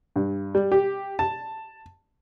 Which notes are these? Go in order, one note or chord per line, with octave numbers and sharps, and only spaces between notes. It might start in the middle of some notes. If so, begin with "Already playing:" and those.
G2
G3
G4
A5